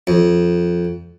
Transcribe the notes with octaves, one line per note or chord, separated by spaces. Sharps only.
F2